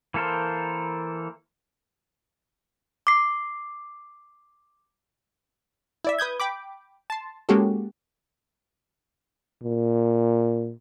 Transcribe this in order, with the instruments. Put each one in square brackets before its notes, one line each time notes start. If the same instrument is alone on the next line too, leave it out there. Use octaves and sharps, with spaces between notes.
[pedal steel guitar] E3 A#3 A4 A#4 C5
[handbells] D6 C7
[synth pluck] E4 D5 E5
B4 D#6 G6 G#6
G5 B5 D6
A5 C6
G#3 A#3 C#4 F#4 G4 A4
[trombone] A#2